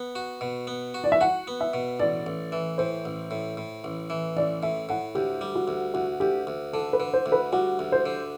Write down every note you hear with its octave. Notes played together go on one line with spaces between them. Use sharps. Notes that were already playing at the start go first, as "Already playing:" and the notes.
Already playing: B3
F#4
B2
B3
F#4
D5
E5
F#4 F#5
B3
E5
B2
A1 D5
A1
E3
A2 C5
A1
A2
A2
A1
E3
A1 D5
A2 E5
A2 F#5
D2 G4
G3
F#4
D2
D2 F#4
D2 G4
D2
D3 A4
B4
D3
C5
D2
B4
G3 F#4
D2
C5
D3